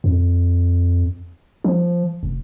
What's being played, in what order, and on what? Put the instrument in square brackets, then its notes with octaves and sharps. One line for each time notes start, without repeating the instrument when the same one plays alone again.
[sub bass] F2
F3
F1